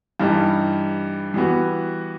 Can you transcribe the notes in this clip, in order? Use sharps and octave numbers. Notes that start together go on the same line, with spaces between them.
G2 E3 G3 D#4
E3 G3 B3 F#4